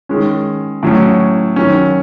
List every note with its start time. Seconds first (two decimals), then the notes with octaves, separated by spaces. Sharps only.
0.09 D#3 G#3 C#4
0.83 A2 F#3 C#4
1.56 D#3 F#3 C#4